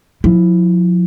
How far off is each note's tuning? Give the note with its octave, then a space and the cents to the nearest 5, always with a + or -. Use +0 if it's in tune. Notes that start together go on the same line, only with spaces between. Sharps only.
F3 +40 E4 +0